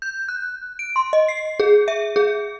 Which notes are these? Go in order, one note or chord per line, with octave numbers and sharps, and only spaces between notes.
G6
F#6
D7
C6
D#5
C7
G#4
E5
G#4